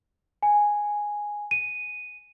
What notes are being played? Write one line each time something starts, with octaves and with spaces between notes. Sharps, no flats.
G#5
D#7